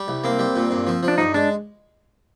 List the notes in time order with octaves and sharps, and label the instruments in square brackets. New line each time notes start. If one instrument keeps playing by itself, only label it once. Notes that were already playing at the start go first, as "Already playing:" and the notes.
Already playing: [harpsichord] G3
C2
[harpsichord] A#3 [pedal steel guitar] C4
[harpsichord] G3
A#2
G2
F3
F3
[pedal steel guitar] D4
[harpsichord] G2 [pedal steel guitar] D#4
[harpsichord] G#3 [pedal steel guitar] D4